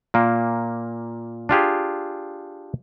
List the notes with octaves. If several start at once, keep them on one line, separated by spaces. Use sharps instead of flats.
A#2 A#3
D4 F4 G4 G#4